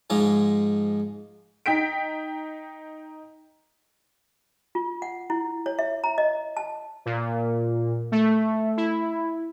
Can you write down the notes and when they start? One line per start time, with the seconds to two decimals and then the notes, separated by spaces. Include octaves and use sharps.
0.10 G#2 F3 G#3
1.66 D#4 G5 B6 D7
4.75 F4
5.02 F#5
5.30 E4
5.66 C#5
5.79 E5
6.04 A#5
6.18 D#5
6.57 A5
7.06 A#2
8.12 A3
8.77 E4